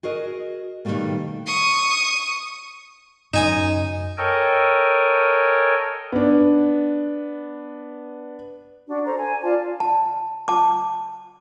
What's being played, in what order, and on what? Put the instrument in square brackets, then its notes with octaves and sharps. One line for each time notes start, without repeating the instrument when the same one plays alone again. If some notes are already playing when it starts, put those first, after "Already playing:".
[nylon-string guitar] F#4 G#4 A#4 D#5
B2 D#3 F#3 G3 A3 A#3
[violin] C#6 D#6
[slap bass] F#2 [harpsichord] D#4 G#5 D#6
[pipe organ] A4 A#4 C#5 D#5 G5 G#5
[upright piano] B3 D4
[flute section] D4 F#4
A4 C5 A#5
G#5
F4 D5 A5
[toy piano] A5
A5 D6